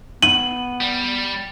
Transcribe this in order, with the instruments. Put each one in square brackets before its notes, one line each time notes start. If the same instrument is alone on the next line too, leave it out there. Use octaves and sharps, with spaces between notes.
[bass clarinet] B3 [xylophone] D#7 [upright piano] F#7
[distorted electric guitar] G3